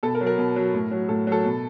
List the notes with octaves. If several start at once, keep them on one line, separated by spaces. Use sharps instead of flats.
B2 A4
A#4
F#3
A#4
B2
F#3
A2
F#3
A2 A4
F#3 A4
B2